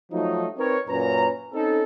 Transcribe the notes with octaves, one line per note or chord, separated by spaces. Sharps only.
F3 F#3 A3 D#4
C4 D#4 A#4 B4 C#5
F#2 A#2 C#4 B4 A#5
C4 C#4 D#4 A4